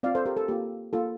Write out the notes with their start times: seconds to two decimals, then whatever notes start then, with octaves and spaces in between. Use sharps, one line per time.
0.03 C4 F4 D5 F5
0.15 A4 C5
0.26 G4 A#4
0.37 A4
0.48 A#3 F4 G4
0.93 A#3 F4 A4